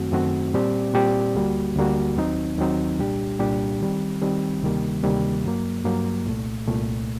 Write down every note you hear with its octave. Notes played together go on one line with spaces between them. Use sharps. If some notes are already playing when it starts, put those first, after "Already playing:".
Already playing: F#2 D#3 A3 C4 F#4
F#2 D#3 A3 C4 F#4
A#2 G3 C4 G4 D5
A#2 G3 C4 G4 D5
D2 D3 G3 A#3 F#4
D2 D3 G3 A#3 F#4
D#2 D#3 F#3 C4 D#4
D#2 D#3 F#3 C4 D#4
C2 A#2 G3 D4 G4
C2 A#2 G3 D4 G4
D#3 G3 C4
D#3 G3 C4
D2 C3 D#3 G3 A#3
D2 C3 D#3 G3 A#3
G2 F#3 A#3
G2 F#3 A#3
C2 A#2 A3
C2 A#2 A3